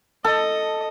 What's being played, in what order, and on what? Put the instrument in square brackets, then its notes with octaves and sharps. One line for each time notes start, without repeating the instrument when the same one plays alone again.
[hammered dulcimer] A4 [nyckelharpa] D#5